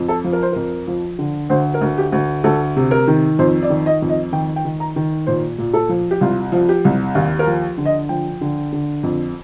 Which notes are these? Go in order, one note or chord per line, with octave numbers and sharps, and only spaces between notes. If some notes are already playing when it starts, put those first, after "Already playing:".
Already playing: F2
A4
F3
A#4
C5
F2 A#4
F3
D3
D2 C5
A#4
D2
G4
D2
D2 A4
C3
A#4
D#3
F2 C5
D5
D#3
D#5
F2
D#5
D#3 G5
G5
D#3
A#5
D#3
A#2 C5
A#2
A4
F3
G4
C2 F4
F3
G4
C2
D#2
A#4
F3
D3
D#5
F3 G5
D3
D3
F2